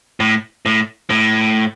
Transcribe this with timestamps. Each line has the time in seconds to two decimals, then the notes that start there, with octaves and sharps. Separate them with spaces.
0.20 A2
0.66 A2
1.10 A2